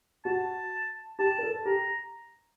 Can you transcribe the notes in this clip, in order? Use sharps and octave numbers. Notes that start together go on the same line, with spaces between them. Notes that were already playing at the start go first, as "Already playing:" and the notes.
F#4 A5
G4 A5
A#4
A4
G4 A#5